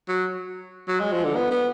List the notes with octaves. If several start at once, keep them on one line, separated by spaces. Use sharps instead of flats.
F#3
F#3
G#3
F3
D3
B3
B3